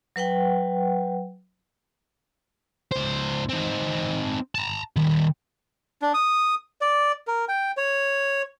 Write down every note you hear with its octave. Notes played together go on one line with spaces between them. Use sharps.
F#3 B4 F#5 G5
C#2 C5
C4 D#4
A5 A#5
D#3 G3
D4
D#6
D5
A#4
G5
C#5